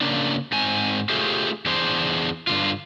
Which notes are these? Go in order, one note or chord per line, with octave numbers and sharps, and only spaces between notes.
C#3 A#3 D4
G#2 C4 G#5
A3 F4 G4 G#4 C5 E5
E2 D4 G#4 C5
G2 D3 F4